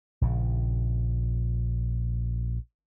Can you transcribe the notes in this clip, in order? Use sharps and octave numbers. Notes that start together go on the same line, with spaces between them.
A#1 C#3